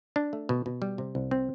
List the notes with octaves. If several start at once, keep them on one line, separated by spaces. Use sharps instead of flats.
D4
A3
B2
B2
G3
C3
C2
C4